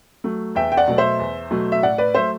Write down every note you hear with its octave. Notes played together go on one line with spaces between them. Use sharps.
F#3 A3
E2 E5 G5
G5
D5 F#5
B2 F#3 A3
C5 E5
E2
B2 F#3 A3
E5
A2 D5 F#5
B4 D5
F#3 A3 C5 E5